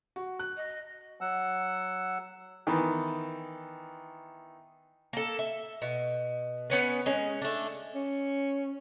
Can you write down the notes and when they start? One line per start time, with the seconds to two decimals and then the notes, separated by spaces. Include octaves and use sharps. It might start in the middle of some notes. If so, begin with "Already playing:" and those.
0.16 F#4
0.39 F#6
0.57 D#5
1.21 F#3 F#5 E6
2.67 D#3 E3 B3
5.13 A#3 A4
5.39 E5
5.82 B2
6.70 B3 C#4 B4
7.06 G#3 C#4
7.42 A3 D4
7.94 C#4